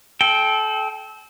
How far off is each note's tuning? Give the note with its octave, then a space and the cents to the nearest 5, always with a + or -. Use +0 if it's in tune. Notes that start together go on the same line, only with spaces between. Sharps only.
A4 -30 G5 +0